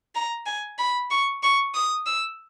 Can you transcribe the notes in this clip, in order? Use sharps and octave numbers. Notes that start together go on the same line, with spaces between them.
A#5
G#5
B5
C#6
C#6
D#6
E6